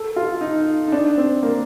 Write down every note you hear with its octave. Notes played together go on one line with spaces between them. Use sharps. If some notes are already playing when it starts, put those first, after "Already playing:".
Already playing: A4
F4
D#4
D#4
D4
C4
A#3